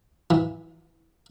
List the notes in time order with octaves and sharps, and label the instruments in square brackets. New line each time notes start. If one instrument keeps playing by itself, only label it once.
[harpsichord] E3